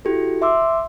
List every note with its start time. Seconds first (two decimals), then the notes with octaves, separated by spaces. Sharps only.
0.05 E4 F#4 G4 A4
0.42 E5 C6 D6 E6